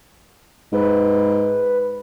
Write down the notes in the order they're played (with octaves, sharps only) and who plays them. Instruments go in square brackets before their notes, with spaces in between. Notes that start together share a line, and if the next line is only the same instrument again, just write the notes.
[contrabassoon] G#2 [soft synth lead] B4